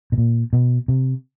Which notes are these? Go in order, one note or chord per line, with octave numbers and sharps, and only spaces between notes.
B2
A#2
B2
C3